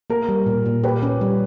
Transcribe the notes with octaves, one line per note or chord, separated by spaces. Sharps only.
A#3 A#4
G3
A#2
A#2
G4 B4
C#4
G3